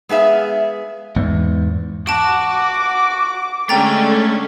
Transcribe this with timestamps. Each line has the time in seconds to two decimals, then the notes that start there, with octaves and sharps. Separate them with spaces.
0.09 G#3 B3 G#4 E5 F5
1.16 E2 G#2
2.07 F#4 F#5 A5 D6 D7
3.69 D3 G#3 A3 C#4 G5 A#5 A6